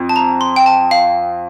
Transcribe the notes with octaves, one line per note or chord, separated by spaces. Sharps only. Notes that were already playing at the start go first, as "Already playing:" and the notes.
Already playing: F2
A5
A#5
C6
G5
A5
F5